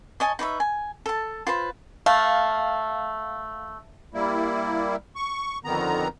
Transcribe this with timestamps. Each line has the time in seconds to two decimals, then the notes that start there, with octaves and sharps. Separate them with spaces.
0.20 C#5 D#5 G#5 A5
0.39 D#4 B4 C#5 E5
0.60 G#5
1.06 A4 A5
1.47 F4 B4 C5
2.06 A3 F5
4.14 G3 A#3 E4
5.16 C#6
5.65 F2 D3 D#3 B3 A#5